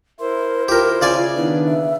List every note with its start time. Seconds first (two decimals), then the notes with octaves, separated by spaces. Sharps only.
0.20 E4 A#4 C5
0.68 F4 G4 A#4
1.02 C#3 D5 G#5
1.35 D#3 B3 D4 E4
1.66 E5